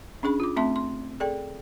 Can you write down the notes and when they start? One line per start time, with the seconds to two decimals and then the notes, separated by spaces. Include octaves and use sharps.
0.23 C#4 D4 G#4 B5
0.40 F4 D6
0.56 A3 C4 E5 A5 C6
0.76 C6
1.20 G#4 A4 D5 G5